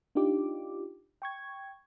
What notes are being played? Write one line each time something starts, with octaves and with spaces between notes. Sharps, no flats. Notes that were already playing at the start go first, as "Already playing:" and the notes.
D4 D#4 F4 G4 D6
G5 C#6 G#6